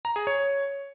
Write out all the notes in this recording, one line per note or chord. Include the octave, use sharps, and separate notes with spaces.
A#5
G#4
C#5